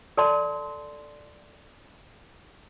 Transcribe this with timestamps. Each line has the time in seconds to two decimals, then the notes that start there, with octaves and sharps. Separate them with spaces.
0.17 A4 D5 A5 C6